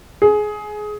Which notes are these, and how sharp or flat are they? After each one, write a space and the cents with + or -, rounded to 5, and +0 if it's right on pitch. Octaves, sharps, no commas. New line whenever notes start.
G#4 +20